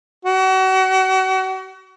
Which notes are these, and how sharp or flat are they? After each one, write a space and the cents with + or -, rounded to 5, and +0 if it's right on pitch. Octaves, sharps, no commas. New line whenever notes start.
F#4 +35